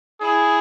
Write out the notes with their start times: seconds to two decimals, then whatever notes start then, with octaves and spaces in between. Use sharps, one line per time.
0.21 E4 G#4